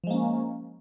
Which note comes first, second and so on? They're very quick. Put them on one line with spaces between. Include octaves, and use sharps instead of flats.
F3 G#3 A#3 C#4